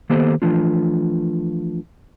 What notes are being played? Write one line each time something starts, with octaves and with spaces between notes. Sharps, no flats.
D#3 A#3 B3 G4 A4 C5
E3 F3 A3 D4 F4